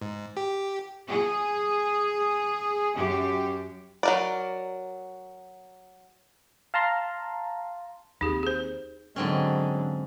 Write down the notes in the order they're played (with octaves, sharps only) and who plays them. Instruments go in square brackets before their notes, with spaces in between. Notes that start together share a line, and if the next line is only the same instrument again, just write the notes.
[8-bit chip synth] G#2
G4
[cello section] G#4
F#2 G4
[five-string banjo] F#3 A#4 D5
[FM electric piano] F5 A5 A#5 C6
[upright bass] D#2 C4 [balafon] D#4 G4 G#4
[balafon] G#4 C5
[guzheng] G#2 C4 C#4 [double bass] D3 F#3